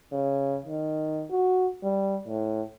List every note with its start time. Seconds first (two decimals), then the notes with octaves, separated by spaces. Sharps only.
0.12 C#3
0.65 D#3
1.31 F#4
1.83 G3
2.28 A2